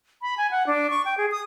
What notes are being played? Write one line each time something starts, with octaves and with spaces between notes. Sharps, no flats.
B5
G#5
F#5
D4
C#6
G5
G#4
D#6